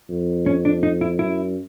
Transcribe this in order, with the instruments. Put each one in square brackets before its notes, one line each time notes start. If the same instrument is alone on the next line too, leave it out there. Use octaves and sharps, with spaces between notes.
[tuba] F2
[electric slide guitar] C#4
D4
D#4
E4
[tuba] F#2 [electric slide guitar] E4